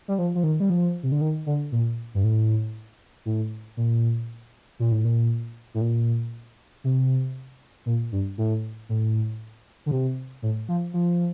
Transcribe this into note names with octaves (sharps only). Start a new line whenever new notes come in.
G3
F3
F3
D#3
G3
F3
C3
D3
D#3
D3
A#2
G2
A2
A2
A#2
A#2
A2
A#2
A2
A#2
C3
A#2
G2
A2
A2
D3
C3
A2
F3
F3